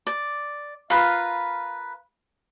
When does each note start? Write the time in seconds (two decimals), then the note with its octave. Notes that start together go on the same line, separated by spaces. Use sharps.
0.07 D5
0.90 F4 A#4 B4 F5